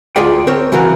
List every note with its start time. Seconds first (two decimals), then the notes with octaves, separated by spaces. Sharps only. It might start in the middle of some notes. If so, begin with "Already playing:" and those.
0.16 D2 F4 G#4 D5 G5
0.47 C4 A#4 C5 C#5
0.72 C#3 E3 F#3 F#4 A#4